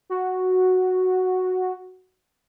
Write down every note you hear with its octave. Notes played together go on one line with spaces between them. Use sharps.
F#4